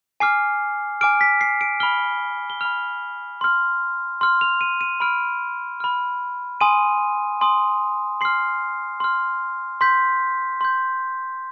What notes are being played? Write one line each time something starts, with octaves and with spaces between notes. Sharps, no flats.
G#5 D6 F6 C7
G#5 D6 F6 D7
B6
C7
D7
B5 F6 G7
G7
B5 F6 F7
C6 F6
C6 F6
F7
D#7
D#7
B5 F6 D7
B5 F6
G#5 C6 D#6 D#7
G#5 C6 D#6
C6 F6 C7
C6 F6
C6 G6 B6
C6 G6